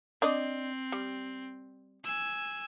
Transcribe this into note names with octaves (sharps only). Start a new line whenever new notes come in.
C4 D4 D5 D#5
G3
G#5 E6